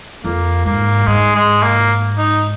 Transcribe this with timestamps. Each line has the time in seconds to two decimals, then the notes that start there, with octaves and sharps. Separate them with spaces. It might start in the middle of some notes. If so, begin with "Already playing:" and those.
0.24 F2 A#3
0.65 G#2 A#3
1.07 G#2 G#3
1.35 G#3
1.63 A#3
2.18 D#4